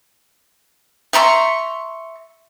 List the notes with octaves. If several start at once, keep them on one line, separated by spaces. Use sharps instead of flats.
E5 A#5 C6 C#6